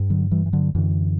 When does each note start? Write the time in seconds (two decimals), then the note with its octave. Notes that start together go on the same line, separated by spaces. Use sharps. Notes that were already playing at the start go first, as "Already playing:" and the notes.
Already playing: G2
0.10 D3 F#3
0.31 E3 G3
0.46 E3
0.53 D3 F#3
0.75 F#2 D3 E3